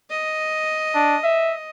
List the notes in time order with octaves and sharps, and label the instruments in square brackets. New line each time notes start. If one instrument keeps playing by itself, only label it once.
[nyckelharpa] D#5
[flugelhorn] D4
E5